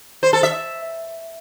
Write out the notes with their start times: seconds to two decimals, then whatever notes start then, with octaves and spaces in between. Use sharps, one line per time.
0.23 C5
0.33 A4
0.43 E5